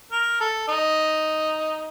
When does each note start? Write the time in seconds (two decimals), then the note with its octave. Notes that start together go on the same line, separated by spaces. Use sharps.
0.12 A#4
0.40 A4
0.68 D#4